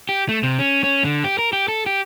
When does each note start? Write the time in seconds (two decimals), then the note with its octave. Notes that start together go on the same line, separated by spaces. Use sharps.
0.09 G4
0.29 A3
0.43 C3
0.59 C#4
0.84 C#4
1.04 D3
1.24 G4
1.39 A#4
1.53 G4
1.68 A4
1.86 G4